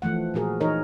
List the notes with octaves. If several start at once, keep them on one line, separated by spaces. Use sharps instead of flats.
E3 F3 A3 F#5
A#2 F3 F#4 G#4 A#4
E3 A#3 D#4 A#4 C#5 D#5